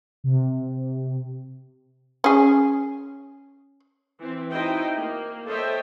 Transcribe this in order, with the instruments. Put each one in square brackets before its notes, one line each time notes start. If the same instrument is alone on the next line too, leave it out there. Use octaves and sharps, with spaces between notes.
[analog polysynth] C3
[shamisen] C#4 G#4
[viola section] E3 C4
D#4 E4 F#4 C5 D#5 G5
A#3
A4 C5 C#5 D#5 E5 G5